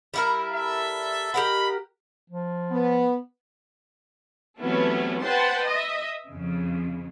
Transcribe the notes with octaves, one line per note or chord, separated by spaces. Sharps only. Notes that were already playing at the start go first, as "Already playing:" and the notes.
G3 E4 A#4
A4 E5
G4 A#4 D#5 F5 F#5 B5
F3
B3
C3 E3 F#3 A3 B3 C#4
B4 C5 F#5 G5 A5 C6
D#5 E5
F2 C#3